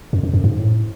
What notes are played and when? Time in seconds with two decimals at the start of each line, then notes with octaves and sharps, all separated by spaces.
0.13 F#2
0.23 F#2
0.33 F#2
0.44 G#2
0.59 A2